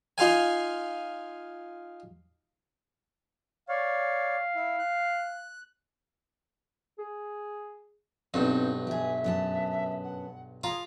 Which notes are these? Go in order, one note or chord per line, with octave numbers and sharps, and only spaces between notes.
D#4 F4 F5 G#5
C#5 D5 F5
E4
F#6
G#4
B1 G2 C4 D#4
G4 G#4 E5
F#2 B3 A5
F#5
F4 G#4 A#5